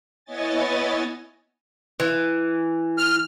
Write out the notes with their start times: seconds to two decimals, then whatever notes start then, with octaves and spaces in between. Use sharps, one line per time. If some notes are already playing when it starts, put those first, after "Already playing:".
0.25 B3 E4 C#5 D#5 G#5 A6
2.00 E3
2.98 F6